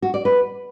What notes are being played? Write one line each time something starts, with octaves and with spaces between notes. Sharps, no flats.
F#4
D5
B4